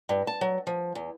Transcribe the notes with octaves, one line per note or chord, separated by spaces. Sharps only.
G2
A5
F#3
F3
E2